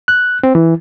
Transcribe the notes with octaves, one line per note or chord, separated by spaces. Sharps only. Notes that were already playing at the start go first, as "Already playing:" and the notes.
F#6
C4
E3